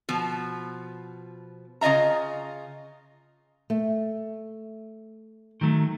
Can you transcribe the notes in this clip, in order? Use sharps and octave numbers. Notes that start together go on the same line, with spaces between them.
B2 F3
C#3 F4 D#5 E5 A#5
A3
D#3 F#3 A3